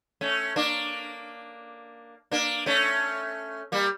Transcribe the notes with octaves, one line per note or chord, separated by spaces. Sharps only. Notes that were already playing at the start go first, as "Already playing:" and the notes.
A3 C#4
A#3 D4
A#3 D4
A3 C#4
G3 A#3